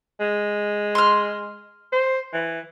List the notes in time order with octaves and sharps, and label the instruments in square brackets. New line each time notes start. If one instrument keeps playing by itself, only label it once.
[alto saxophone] G#3
[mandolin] C6 F6
[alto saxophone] C5
E3